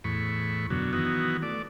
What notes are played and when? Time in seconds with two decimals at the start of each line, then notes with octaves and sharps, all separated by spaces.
0.04 E2 A2 B5 C#6
0.70 F#2 B2 D3 F#3
0.93 D#3 E3 F#3 B3 F#4
1.43 A3 D5